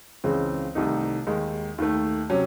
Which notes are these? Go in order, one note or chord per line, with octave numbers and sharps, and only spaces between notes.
C#2 C#3 E3 G#3 C4
C2 C3 D#3 A3 D#4
D#2 D#3 G#3 D#4
D#2 D#3 A3
C3 F#3 C#4